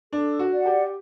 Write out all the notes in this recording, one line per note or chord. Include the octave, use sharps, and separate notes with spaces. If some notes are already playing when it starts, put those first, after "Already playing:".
D4 A4
F#4
D5 F#5
G4